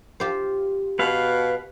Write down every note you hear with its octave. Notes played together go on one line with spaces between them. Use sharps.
F4 G4 C5
B2 B4 F5